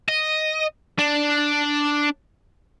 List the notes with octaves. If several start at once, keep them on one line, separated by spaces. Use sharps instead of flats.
D#5
D4